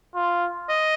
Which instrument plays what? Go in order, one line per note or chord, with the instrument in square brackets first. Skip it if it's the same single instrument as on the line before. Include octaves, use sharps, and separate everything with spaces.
[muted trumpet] F4
[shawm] D#5